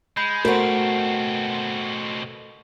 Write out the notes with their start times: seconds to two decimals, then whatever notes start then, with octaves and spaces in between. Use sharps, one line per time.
0.17 G#3 B5 G6
0.45 B2 A3 C4 F#4 A#4 C5 F#5